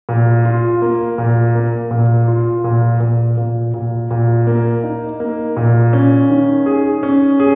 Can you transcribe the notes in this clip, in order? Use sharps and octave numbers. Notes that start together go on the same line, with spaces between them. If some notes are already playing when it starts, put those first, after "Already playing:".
A#2
F4
A#3
A#2
A#3
A#2
F4
A#2
A#2
A#2
A#2
A#2
A#3
D#4
A#3
A#2
C#4
D#3
G#4
C#4
G#4